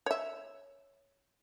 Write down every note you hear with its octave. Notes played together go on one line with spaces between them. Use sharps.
C#5 E5